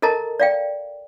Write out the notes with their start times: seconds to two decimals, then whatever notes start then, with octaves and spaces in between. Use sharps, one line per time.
0.02 A4 A#4 D#5 A5 A#5
0.40 D5 F5 G5